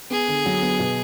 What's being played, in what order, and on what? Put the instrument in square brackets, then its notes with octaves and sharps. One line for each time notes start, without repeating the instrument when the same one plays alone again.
[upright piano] B3 [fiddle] G#4
[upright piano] D3
F#3
B3
B2